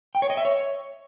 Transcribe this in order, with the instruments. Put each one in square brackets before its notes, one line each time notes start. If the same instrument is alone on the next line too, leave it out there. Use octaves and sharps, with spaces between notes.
[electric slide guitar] G5
C#5
D#5
E5
C#5